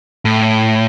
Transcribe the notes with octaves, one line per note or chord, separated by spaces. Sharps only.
A2